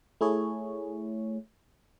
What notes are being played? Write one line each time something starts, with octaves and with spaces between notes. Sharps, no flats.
A3 E4 G#4 C#5